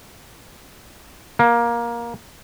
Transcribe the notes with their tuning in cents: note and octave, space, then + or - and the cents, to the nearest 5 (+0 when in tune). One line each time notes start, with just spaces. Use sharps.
A#3 +15